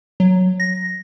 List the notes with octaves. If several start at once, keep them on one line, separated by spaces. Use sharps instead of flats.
F#3
A#6